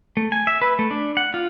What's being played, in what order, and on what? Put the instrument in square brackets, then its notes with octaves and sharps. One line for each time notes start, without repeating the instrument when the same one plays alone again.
[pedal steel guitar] A3
G#5
E5
B4
A3
D4
F#5
F4